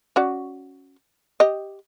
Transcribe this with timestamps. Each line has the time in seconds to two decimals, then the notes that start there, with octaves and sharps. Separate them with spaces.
0.16 C#4 F#4 D5
1.40 G4 D#5